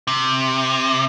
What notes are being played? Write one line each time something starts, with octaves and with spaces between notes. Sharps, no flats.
C3